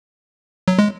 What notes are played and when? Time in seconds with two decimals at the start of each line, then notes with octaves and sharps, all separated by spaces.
0.68 F#3
0.79 G#3